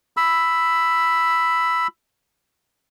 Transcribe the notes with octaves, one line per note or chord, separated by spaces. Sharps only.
B5 E6